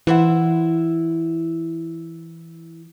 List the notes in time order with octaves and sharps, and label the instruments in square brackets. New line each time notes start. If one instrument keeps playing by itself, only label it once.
[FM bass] E3 [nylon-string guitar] E4 C5 F#5